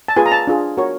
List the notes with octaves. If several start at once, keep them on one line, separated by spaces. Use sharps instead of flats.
A5
F4 G#4 B4 G#5
A#5
A5
D4 F4 G#4
F#4 A#4 C#5